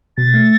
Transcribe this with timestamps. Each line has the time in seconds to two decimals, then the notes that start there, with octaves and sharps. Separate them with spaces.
0.17 B2 A6
0.34 A3